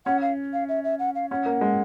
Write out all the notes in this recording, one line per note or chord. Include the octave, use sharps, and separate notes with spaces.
C#4 F#5
F5
F5
E5
E5
F#5
F5
C#4 F#5
A#3
G#3